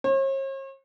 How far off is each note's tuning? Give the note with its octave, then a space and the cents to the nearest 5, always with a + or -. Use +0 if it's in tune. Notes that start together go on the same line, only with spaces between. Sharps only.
C#5 -45